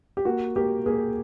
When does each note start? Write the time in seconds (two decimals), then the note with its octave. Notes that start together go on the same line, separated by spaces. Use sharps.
0.17 G4
0.25 A#3 F#4
0.56 A#3 G4
0.86 A#3 G#4